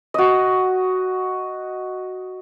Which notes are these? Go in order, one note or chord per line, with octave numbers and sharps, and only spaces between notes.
F#4 D#5